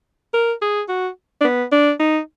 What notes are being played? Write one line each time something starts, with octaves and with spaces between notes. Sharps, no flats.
A#4
G#4
F#4
D4
B3
D4
D#4